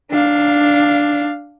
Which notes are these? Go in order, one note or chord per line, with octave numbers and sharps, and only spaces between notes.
D4 F5